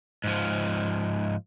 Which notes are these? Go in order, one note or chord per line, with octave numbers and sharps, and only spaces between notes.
G#2 F3